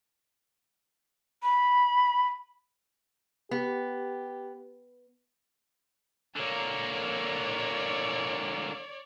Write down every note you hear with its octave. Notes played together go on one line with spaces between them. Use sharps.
B5
B3 G4
D3 A#3 C#5 D5